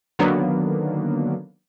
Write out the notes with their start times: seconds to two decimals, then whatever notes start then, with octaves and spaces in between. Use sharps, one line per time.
0.19 D3 D#3 F#3 A#3 B3 D4